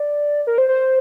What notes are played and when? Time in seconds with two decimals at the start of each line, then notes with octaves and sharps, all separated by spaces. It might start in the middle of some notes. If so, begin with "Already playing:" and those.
Already playing: D5
0.47 A#4
0.58 C5
0.69 C5